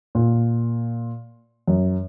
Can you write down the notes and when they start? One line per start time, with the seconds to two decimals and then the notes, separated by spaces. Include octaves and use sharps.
0.15 A#2
1.68 F#2